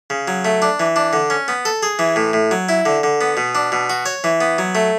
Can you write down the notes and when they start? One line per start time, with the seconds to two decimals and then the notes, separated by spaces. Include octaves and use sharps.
0.10 C#3
0.28 F#3
0.45 A3
0.62 D4
0.80 E3
0.96 D4
1.13 D3
1.30 C#4
1.48 B3
1.65 A4
1.83 G#4
1.99 E3
2.16 A2
2.33 A2
2.51 F#3
2.69 E4
2.86 D3
3.03 D3
3.21 B3
3.37 B2
3.55 D4
3.72 B2
3.90 F#4
4.06 C#5
4.24 E3
4.41 B3
4.58 F#3
4.75 A3